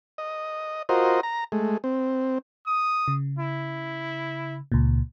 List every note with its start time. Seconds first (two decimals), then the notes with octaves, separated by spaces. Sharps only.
0.18 D#5
0.89 F4 F#4 A#4 C5 D#5
1.23 A#5
1.52 G#3 A3
1.84 C4
2.66 D#6
3.08 C#3
3.38 E4
4.72 C#2 A#2